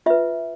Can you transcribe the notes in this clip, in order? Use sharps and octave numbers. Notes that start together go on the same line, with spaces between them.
F4 B4 E5